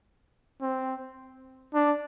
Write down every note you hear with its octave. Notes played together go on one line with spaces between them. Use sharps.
C4
D4